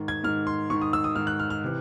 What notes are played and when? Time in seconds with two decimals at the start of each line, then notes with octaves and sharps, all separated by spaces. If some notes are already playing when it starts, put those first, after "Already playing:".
Already playing: G#2 D#3
0.08 G#6
0.24 G#2 D#3 F6
0.47 C6
0.70 G#2 D#3 C#6
0.82 D#6
0.93 E6
1.04 D#6
1.16 G#2 D#3 F6
1.27 F#6
1.39 F6
1.50 F6
1.64 C3 E3